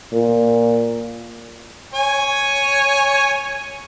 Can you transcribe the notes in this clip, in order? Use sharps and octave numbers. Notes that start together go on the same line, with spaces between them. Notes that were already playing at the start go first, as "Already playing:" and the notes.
A#2
C#5 G#5